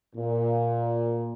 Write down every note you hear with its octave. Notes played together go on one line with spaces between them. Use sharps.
A#2